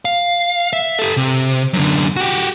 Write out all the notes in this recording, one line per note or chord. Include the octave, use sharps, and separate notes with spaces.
F5
E5
G4 A4
C3
F#2 D3
F#4 G4